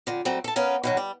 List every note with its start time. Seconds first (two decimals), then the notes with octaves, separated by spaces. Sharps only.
0.07 F2 D3
0.25 F#3 G3 A3 C4
0.44 A4 A5
0.56 B3 C#4 A#4 F5
0.83 B2 D#3 F#3
0.97 G3